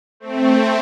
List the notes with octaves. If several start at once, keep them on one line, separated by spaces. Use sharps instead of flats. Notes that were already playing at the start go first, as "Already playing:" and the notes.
A3 C4